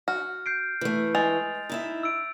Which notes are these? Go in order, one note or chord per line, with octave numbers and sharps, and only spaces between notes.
F#4 F6
G6 C7 D7
E3 A3
G#3 A6 F7
D#4 E4 E5
E6 D7